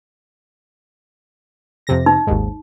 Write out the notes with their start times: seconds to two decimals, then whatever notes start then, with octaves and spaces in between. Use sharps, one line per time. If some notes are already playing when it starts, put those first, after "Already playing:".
1.87 F2 C3 A#6
2.06 D#4
2.27 G#1 D#2 G#2